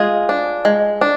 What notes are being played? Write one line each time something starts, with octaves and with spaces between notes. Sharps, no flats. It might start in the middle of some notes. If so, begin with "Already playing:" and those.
Already playing: G#3 F4 G#4
D4
G#3
D4